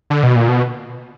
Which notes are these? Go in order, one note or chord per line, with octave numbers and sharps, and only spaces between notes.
D3
B2
A#2
B2